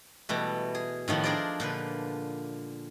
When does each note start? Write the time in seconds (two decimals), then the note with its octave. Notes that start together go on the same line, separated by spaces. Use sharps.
0.29 B2 E3 G3 A3
0.75 G#4
1.08 A2 D#3 F3 B3
1.24 D4 G#4 A#4 C5 D5
1.60 A#2 D3 B4